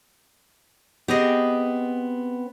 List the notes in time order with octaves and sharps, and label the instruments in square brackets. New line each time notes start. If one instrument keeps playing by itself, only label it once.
[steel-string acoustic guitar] B3 C4 [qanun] G4 G#4 D#5